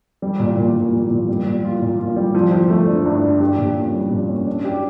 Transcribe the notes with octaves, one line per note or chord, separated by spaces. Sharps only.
G3
A#2
A#2
G3
A#2
A#2
G3
A#2
F4
A#2
F4
G3
F3
F3
A3
D4
G2
D4
G4
A#2
C#4
G3
A#2
C#4
D4
G4